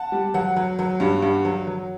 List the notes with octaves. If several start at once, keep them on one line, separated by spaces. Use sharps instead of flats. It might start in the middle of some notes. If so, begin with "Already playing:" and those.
Already playing: F#5 A5
G3
F#3 F#5
F#3
F#3
G2
G2
F#3
F#3